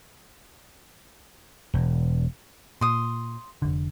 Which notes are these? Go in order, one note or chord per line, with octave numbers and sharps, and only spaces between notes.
E1
A#2 C6 D#6
F1 A#1 D3